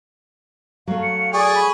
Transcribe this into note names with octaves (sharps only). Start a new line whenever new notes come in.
F#3 A3 F5
C#7
F5
G#4 D5 C#6
B5